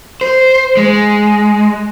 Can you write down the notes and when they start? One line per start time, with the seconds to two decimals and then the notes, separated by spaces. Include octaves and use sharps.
0.21 C5
0.77 G#3